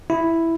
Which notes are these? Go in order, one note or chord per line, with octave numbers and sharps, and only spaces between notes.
E4